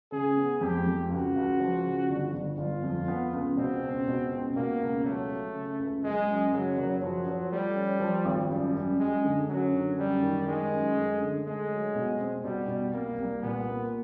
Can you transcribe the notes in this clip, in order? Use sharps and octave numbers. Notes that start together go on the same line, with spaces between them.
C#3 G#4
B3
F2 G4
F2
C#2 F#4
C#2
F3
C#3
G1
G1
G1 F4
F2
B3
C#2
B2 C4
C#2
B2
C#2
B2 A#3
C#2
F#3 A3
F#3
C#3
C#2
F#1 G#3
F#2
C#3 F#3
F#1
F3 F#3
F3
G3 A3
C#4
F3
G#1
F#2 G3
F#2
F#2 G#3
D3
F#2 F#3
D3
F#2 G3
D#3
D#3 G#3
F#2
A3
D3
G#3 A3
F#3
B2
C4
B2 G3
B2
C2 A#3
C2
A#2 B3
A#3